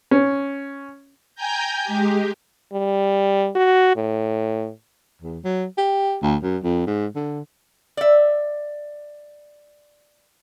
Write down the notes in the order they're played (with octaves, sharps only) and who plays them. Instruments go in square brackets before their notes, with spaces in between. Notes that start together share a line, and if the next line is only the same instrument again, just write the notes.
[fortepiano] C#4
[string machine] G5 G#5 A#5 G6
G#3 G4
[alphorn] G3
F#4
A2
[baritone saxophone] E2
F#3
G4
D2
F#2
F2
G#2
D3
[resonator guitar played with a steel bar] D5 E5